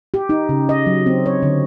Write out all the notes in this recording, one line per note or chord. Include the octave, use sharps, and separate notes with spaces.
G4
D#4
C#3
D#5
F#3
C4
C#5
D3